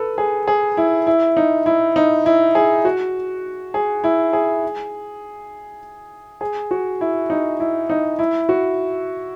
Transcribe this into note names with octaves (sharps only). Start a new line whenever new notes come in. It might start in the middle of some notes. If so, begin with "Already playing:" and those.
Already playing: A4 B4
G#4
G#4
E4
E4
D#4
E4
D#4
E4
G#4
F#4
G#4
E4
G#4
G#4
F#4
E4
D#4
E4
D#4
E4
F#4